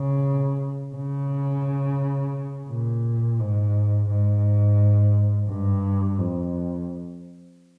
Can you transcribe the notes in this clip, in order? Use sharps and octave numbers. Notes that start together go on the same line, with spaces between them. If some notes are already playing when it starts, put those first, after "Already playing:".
Already playing: C#3
C#3
A#2
G#2
G#2
G2
F2